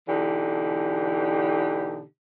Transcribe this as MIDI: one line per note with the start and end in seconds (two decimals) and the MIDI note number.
0.09 2.03 47
0.09 2.03 50
0.09 2.03 52
0.09 2.03 63
0.09 2.03 67